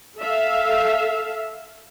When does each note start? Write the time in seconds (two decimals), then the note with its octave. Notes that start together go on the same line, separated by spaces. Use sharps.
0.19 A4 E5 F5